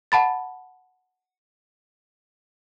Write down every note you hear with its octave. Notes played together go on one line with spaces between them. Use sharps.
F#5 A5 B5 A6